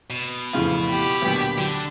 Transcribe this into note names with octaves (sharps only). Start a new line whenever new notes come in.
B2
A1 F2 C#3 F4
G4 B5
D2 A#2 F#3 B3
D3 F#3